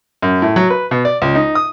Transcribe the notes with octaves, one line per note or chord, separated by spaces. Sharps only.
F#2
A2
F#3
B4
B2
D5
C#2
D#4
D#6